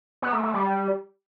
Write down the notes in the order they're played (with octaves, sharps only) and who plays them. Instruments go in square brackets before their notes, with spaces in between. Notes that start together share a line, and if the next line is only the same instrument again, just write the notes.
[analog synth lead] B3
A3
A3
G3